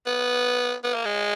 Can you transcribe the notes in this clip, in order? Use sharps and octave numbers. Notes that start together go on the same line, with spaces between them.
B3
B3
A#3
G#3